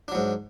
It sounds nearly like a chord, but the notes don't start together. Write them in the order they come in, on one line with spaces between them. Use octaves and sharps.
D4 F#3 G#2